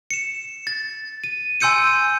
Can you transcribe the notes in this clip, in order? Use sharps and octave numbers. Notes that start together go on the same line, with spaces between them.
C#7 E7
A6
D#7
G#5 C6 E6 G6 C#7 D#7